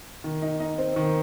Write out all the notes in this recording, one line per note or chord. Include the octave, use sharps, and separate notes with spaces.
D#3
D#4
D#4
C4
D#3